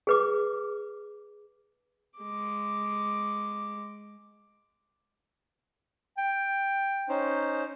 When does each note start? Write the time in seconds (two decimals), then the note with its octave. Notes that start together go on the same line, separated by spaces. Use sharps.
0.07 G#4 B4 D6
2.18 G#3 D6
6.18 G5
7.09 C#4 D#4 C5